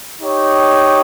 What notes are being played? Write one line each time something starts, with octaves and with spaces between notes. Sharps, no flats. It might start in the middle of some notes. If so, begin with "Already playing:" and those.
D#4 G4 C#5 G5